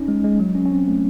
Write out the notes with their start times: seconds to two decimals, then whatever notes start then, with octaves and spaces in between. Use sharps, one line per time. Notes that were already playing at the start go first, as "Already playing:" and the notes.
Already playing: C#4 D#4
0.08 G#3
0.24 G#3
0.40 F#3
0.55 C#4
0.66 C#4
0.71 C4
0.88 A3